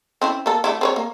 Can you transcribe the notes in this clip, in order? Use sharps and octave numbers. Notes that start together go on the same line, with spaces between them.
C4 C#4 E4
A#3 A4
D3 A3 E4
C4 B4 C#5
A#3